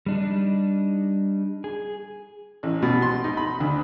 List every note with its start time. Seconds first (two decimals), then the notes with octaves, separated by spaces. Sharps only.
0.06 G3 D4 D#4
1.64 G#4
2.63 A1
2.82 B2
3.02 C6
3.24 D#4
3.37 B5
3.60 D2